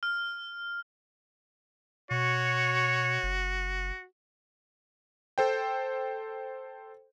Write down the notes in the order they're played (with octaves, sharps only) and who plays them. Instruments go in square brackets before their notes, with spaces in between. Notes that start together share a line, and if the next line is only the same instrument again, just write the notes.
[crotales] F6
[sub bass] B2 [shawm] F#4 [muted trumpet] C#5
[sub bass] F#1
[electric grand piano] A4 C5 G5